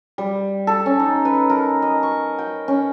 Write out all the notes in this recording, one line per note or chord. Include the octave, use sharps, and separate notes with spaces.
G3
A4
C#4
D#4
B4
A#4
D#5
C#6
G5
C#4